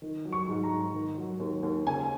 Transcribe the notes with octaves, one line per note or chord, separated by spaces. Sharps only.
D#3
F#3
C#6
G#2
A#5
G#2
D#3
F#3
D#2
D#2
C#3 G#5